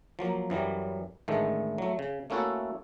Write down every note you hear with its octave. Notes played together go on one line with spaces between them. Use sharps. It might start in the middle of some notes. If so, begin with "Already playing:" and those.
F3 F#3 A#3
F#2 E3 F#3 G3
A1 A2 D3 D#3 G#3 A3
F#3 A3
C#3
A3 A#3 C#4 E4 F#4 A4